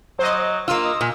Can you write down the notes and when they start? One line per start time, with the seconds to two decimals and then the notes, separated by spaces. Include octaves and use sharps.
0.19 F#3 C5 D#5
0.68 A#3 F4 E6
0.84 D#5
1.01 A#2